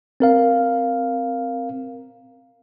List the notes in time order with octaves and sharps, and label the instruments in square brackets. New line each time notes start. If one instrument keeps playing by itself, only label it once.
[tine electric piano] C4 A#4 F5